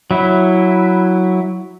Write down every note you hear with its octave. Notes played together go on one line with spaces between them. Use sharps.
F#3 E4